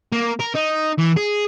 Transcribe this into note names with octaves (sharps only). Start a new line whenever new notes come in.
A#3
A#4
D#4
E3
G#4